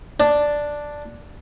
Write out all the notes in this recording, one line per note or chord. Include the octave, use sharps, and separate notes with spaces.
D4